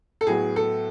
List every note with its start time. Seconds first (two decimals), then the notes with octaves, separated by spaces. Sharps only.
0.21 A4
0.27 A2 F#3 B3 G#4
0.56 A4